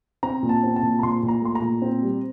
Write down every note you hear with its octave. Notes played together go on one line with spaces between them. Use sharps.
C4 A#5
A#2
A5
C4
A5
A#2
A#5
A#2 C6
A#2
A#5
A3 C6
A#5
A#2
C4
G3